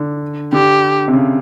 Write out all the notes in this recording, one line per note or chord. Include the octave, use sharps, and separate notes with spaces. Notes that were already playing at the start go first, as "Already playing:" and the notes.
Already playing: D3
D3 G4
C3
C#3